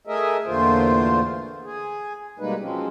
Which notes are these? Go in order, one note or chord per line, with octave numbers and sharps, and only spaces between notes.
A3 G#4 A#4 D#5 E5
E2 A#2 D3 A3 F4 C5
G#4
B2 G3 G#3 A#3 D#4 B4
F3 F#3 G#3 C4 C#4